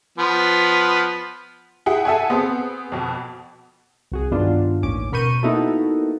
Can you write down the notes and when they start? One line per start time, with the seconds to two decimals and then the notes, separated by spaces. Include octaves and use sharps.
0.18 F3 B3
1.86 E4 G#4 F#5 G5
2.05 A4 E5 F#5 G#5
2.30 B3 C4 G#4
2.92 F2 B2
4.12 C2 F#4 G#4
4.31 G2 D#3 B3 D4 F4
4.82 A1 D#2 C#4 D6
5.12 B2 A#4 B5 C#6 G6 D#7
5.43 A#3 B3 D#4 E4 F#4 A4